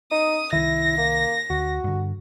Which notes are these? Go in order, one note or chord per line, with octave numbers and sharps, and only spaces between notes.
D#4 D#6
C2 D#3 E4 A#6
A#3
D2 F#4
G2 D3